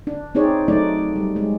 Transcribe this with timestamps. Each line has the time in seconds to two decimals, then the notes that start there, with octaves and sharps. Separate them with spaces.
0.07 D4
0.35 C4 D#4 G#4 C#5 D5
0.68 F#3 A3 D4 D#4 D5
1.16 G3
1.36 G#3